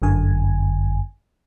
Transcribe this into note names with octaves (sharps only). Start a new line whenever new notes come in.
G1 F#2 D3 G#5